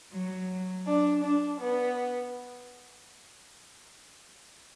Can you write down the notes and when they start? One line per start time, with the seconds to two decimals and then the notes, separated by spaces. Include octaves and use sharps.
0.12 F#3
0.86 D4
1.22 D4
1.59 B3